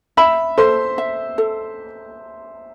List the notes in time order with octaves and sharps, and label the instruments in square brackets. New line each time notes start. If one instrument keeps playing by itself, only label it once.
[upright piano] E5 E6 [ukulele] B5
[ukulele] A4 [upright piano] C5 C6
[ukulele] E5
A4